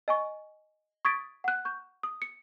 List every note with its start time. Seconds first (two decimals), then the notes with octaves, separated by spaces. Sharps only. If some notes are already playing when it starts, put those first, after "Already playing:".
0.08 D#5 G#5 C#6
1.05 C#6 D#6 G#6 A6 B6 D7
1.44 F#5 F#6
1.65 C#6 G6
2.03 D#6
2.22 C#7